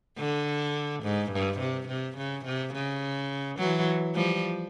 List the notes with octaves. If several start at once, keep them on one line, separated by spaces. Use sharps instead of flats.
D3
G#2
G2
C3
C3
C#3
C3
C#3
E3 F#3
F3 G3